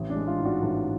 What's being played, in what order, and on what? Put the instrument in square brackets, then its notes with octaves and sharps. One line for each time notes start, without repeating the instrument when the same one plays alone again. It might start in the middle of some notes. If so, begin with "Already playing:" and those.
Already playing: [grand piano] A1
D4
G#3
F4
G#2
D4 F#4
A1